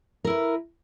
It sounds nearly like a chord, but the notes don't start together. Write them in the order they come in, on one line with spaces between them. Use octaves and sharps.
A#4 E4 B4